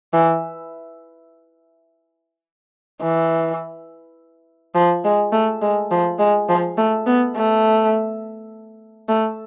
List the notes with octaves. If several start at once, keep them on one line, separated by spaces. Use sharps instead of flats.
E3
E3
F3
G#3
A3
G#3
F3
G#3
F3
A3
B3
A3
A3